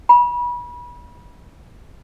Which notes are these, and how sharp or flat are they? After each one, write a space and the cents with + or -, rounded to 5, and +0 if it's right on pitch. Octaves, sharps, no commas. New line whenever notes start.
B5 -30